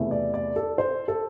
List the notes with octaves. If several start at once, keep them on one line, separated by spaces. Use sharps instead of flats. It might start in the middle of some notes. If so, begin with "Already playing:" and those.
Already playing: E2 C3 E3 A3
D5
D5
A4
C5
A4